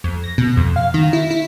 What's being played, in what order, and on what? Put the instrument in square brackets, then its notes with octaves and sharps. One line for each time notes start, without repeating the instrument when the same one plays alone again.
[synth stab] F2
A#6
B2
F2
F5
D#3
E4
E4